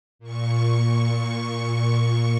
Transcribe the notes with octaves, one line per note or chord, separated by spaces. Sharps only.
A#2 C#6